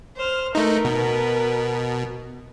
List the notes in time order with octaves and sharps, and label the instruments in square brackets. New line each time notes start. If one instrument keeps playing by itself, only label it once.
[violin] C5 F6
[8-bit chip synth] A3 D#4 [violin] A#4 B4
[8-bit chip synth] B2